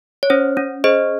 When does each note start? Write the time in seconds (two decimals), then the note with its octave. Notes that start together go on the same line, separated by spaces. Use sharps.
0.23 C#5
0.30 C#4 C5
0.57 C#4
0.84 G#4 C5 D#5